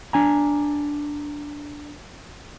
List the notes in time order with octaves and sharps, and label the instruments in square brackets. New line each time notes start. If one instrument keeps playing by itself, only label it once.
[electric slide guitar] D4 G#5 A#5